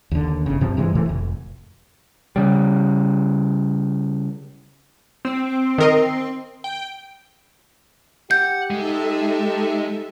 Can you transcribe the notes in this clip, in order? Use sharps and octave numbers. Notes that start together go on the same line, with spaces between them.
D#2 D3
G1 C#3
G2 C3 F3 C4
G2 C3 E3 G#3
A2 C3 E3 A3
F1
C#3 G3
C4
D#3 A#4 D#5
G5
G4 F#5 G6
G#3 D#4 A4 E5